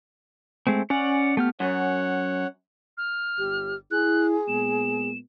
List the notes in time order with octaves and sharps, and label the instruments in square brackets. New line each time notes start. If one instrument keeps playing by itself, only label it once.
[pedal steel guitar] G#3 A3 C4
[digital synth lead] C#4 [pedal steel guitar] C#5 D5 F#5
[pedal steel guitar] A3 G4 F6 [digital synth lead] B3
[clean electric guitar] F#2 [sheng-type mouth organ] C#5 F#5
[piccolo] F6
[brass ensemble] G1 [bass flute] G4
[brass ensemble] E4 [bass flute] G#4 [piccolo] F#6
[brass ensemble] A#2 G#3 B3 [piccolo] E7